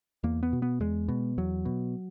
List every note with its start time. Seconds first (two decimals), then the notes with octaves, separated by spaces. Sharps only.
0.24 E2 A#3
0.43 B3
0.53 B2
0.62 B3
0.80 E2 G#3
1.08 B2
1.38 E2 F#3
1.65 B2